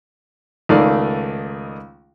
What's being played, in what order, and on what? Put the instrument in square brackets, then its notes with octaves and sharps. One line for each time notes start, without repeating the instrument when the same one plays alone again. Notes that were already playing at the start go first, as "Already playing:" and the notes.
[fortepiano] C#2 D#3 A3 D5 F5